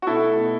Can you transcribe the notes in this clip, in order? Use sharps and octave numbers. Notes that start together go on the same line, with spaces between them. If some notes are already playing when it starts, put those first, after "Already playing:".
F#4
B2 E4 A4
A3
B2